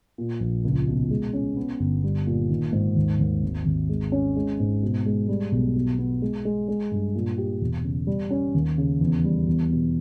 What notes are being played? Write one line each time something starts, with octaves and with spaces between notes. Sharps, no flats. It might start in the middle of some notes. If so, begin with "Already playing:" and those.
A#2
A#1
C#2
B2
G#3
C#4
B3
G1
G3
A#2
D#3
G#2
D#2
D#2
G#1
G#1
G#3
C#4
G#3
G#2
B2
G#3
G3
B1
B2
B3
G#3
G#3
G#3
G2
A#2
G4
E1
C#3
G3
C#4
D#2
C#3
E2
G3
E2
B2